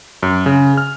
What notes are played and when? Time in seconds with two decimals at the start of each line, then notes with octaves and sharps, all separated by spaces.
0.23 F#2
0.46 C#3
0.78 F6